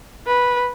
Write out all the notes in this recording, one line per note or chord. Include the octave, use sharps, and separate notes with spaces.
B4